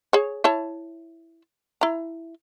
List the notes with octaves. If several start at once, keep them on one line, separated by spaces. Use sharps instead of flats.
G#4 C#5
E4 C#5 A5
E4 A#5